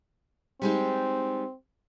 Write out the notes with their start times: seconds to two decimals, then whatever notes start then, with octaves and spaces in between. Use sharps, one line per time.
0.62 G3 G#3 C4 D#4